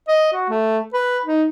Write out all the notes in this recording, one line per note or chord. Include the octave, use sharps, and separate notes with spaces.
D#5
F#4
A3
B4
D#4